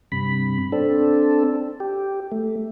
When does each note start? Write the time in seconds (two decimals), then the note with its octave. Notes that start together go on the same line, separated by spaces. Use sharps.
0.12 G2 C3 B5
0.72 C4 D4 A4
1.80 G4
2.32 A3